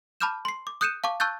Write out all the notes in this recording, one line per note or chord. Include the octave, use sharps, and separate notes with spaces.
A5 B5 D6 F6 G6 E7
C6 C7
D6
D#6 F#6 G6 C#7 D#7 E7
F5 A5 C#6 D6
A5 C#6 E6 F#6 G6 A6